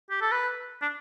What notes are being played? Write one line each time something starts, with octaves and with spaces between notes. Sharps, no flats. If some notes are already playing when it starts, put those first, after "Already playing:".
G4
A4
B4
D4